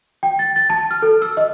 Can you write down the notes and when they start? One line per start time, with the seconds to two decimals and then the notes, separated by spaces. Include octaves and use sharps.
0.23 G5
0.39 A6
0.56 A6
0.70 A5
0.91 F6
1.02 A4
1.22 E6
1.37 D#5